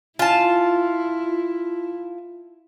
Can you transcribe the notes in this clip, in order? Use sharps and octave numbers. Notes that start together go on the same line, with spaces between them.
E4 F4 A5